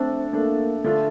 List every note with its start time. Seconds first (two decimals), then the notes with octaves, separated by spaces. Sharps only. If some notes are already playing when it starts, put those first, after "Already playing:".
Already playing: A3 C4 D4 A4
0.33 A3 A#3 D4 A4
0.84 D3 A3 D4 F4 A4